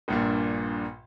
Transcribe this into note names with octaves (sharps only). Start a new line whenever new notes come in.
A#1 G2 A#2